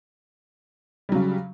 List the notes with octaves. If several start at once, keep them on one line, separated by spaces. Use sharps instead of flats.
C#3 F#3 G3